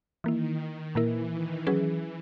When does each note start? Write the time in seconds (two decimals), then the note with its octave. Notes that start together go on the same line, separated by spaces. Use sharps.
0.24 D#3 E3 A#3 E4
0.95 A#2 E3 A#3 E4 A#4
1.31 D#3
1.67 E3 F#3 C#4 G#4 B4